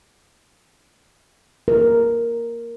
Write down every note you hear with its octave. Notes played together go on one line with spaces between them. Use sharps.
A#4